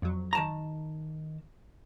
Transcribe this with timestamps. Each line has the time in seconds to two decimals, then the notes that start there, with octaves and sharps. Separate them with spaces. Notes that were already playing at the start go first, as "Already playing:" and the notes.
0.02 F2 F#3
0.33 D#3 A5 A#5